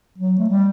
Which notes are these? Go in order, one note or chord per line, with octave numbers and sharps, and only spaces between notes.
F#3
A3
G3